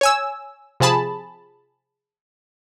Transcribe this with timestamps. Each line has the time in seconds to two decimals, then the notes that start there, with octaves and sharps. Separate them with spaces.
0.01 C#5 G#5 E6
0.80 C3 F3 G#4 A5 B5